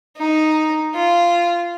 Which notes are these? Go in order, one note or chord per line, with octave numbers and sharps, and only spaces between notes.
D#4
F4